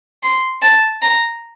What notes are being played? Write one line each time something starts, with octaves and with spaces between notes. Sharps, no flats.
C6
A5
A#5